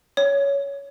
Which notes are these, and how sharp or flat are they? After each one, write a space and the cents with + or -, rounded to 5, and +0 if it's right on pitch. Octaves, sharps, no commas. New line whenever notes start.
C#5 +15